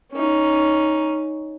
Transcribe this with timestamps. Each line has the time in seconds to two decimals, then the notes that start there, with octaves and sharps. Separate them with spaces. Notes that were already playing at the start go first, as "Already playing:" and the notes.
0.12 C#4 D#4